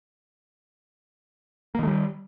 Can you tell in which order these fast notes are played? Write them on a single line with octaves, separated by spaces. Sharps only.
A#3 D#3 A3 G3